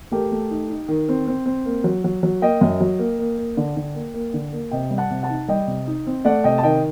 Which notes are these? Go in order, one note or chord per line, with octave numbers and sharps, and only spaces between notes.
A3 G4 A#4
A3
D#4
D#4
D#3
C4
C4
C4
A#3
F#3
F#3
F#3
A#3 D#5 G5
F#2
F#3
A#3
A#3
A#3
D3
D3
A#3
A#3
D3
A#3
C3 D#5 G5
G3
F#5 A5
C3
F#5 A5
D#4
G3 D#5 G5
C3
D#4
C4
A3 D5 F#5
C3 D#5 G5
A5
D#3 D#5 G5